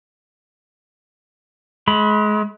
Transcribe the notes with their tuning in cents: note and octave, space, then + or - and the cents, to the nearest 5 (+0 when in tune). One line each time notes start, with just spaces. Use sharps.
G#3 +30 B5 -5